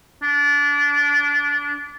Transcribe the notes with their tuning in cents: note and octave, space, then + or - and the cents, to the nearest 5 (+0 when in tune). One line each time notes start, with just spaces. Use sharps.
D4 -25